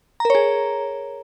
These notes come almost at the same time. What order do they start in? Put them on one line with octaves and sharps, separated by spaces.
A#5 A#4 C#5 G#4